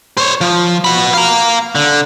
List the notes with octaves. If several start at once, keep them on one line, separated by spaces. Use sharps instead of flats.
C5 C#5
F3
F#4 B5
F5 A#5
D3